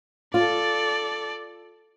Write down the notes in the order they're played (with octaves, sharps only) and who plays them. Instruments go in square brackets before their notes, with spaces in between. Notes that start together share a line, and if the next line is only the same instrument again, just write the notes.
[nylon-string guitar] F4 [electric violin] A4 D5